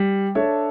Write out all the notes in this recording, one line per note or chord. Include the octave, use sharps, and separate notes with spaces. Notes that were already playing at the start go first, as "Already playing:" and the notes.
Already playing: G3
D4 A4 C#5 E5